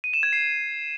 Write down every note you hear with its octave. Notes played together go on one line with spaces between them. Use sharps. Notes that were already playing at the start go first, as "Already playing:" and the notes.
D#7
E7
G#6
C7